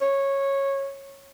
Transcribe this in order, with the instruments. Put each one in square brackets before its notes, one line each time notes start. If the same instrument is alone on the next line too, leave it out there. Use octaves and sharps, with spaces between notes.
[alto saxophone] C#5